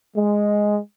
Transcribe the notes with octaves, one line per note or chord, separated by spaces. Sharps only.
G#3